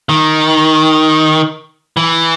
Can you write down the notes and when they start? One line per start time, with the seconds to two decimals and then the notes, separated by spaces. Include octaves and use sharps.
0.09 D#3
1.97 E3